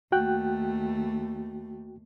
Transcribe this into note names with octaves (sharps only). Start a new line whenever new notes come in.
D#2 A3 F#4 G5 F#6